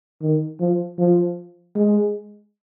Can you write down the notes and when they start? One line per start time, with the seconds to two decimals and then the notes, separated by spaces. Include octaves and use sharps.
0.22 D#3
0.60 F3
0.99 F3
1.76 G#3